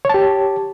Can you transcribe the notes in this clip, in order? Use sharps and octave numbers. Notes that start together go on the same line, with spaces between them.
G4 C#5 A5